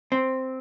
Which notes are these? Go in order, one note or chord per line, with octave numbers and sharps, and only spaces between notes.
C4